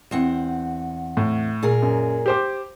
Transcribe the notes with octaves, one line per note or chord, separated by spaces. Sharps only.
E2 C4 F#5
A2
A#2 G#4 A#4
F#2
G4 C5 D6